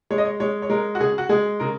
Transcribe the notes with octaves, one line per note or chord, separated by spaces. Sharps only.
G#3 C#5
D#5
C#5
G#3 C#5
C#5
G#3 A#4
F#4
C#3 G#4
F#4
G#3 G#4
C#3 A#4